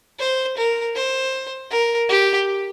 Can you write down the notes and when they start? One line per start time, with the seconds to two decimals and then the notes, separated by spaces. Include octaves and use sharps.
0.20 C5
0.57 A#4
0.96 C5
1.71 A#4
2.09 G4